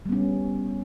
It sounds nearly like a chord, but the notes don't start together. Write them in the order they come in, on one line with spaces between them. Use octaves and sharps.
G3 B3 C#4